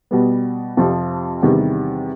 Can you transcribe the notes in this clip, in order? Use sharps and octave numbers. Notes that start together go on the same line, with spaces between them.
B2 G3 B3
F2 C3 F3
E2 C3 D#3 G3